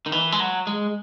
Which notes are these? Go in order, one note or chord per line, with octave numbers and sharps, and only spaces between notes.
D#3
E3
G#3
F#3
G#3